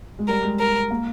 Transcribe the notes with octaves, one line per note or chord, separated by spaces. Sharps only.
G#3
G3 A#4
G#3
A#4
A#3